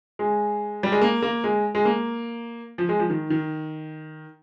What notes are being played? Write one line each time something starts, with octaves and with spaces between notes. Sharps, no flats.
G#3
G3
G#3
A#3
A#3
G#3
G#3
A#3
F3
G#3
F3
D#3
D#3